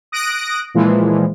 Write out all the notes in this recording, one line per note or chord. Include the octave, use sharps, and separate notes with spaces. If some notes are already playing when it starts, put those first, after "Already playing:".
D#6 F#6 A#6 D7
A#2 E3 F3 G#3